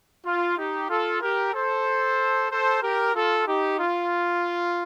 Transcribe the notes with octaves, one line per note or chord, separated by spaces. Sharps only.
F4
D#4 G4
F4 A4
G4 A#4
A4 C5
A4 C5
G4 A#4
F4 A4
D#4 G4
F4